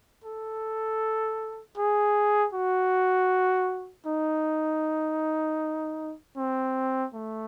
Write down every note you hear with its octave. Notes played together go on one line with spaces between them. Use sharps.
A4
G#4
F#4
D#4
C4
A3